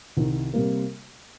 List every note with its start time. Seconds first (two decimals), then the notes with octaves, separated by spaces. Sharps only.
0.17 C2 C3 D#3
0.53 C3 G3 A#3